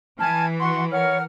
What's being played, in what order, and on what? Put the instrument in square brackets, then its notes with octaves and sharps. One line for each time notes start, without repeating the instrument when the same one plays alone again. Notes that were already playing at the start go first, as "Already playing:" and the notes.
[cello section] E3 [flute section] G#5 F6 G#6 [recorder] A5
[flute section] F#4 F#5 C#6 [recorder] C6
[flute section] A#4 F#5 F6 [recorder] C#5